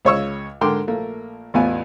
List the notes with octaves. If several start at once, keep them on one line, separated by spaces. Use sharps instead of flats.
C#2 C#3 C#5 D#5 C#6 E6
G#2 D3 A#4 G5 C6 D6
A#1 A3 A#3
A1 E2 B3 F4 G#5